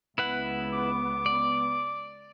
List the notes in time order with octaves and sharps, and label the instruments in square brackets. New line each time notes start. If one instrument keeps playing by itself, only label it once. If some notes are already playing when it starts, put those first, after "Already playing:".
[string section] C#2 B3 [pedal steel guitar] E4 B4 F#5
[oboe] D6
[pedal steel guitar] D5